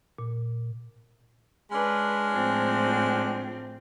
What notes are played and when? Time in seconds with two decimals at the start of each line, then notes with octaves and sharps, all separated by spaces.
0.19 A#2
1.71 G#3 C#4 D4 B4
2.32 A2 F3 C4